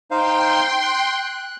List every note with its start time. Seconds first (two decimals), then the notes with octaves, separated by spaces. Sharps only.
0.11 D#4 C5 F5 G5 C6
0.83 F#6